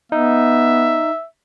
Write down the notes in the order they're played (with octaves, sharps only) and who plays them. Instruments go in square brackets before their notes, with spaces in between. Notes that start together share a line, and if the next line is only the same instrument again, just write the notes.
[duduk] B3 [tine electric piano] D#4 [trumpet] E5